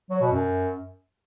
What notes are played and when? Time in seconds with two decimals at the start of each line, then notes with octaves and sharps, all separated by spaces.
0.10 F#3
0.21 B2
0.32 F#2